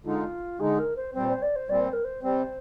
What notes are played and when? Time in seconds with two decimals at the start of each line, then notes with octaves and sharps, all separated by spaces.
0.04 D3 G#3 D#4 F4
0.59 D3 G#3 D#4 G#4
0.78 A#4
0.96 C5
1.14 A#2 G3 C4 C5
1.28 C5
1.42 D5
1.55 C5
1.68 A#2 G3 C4 D5
1.80 C5
1.92 A#4
2.04 C5
2.23 C3 G3 C4 C5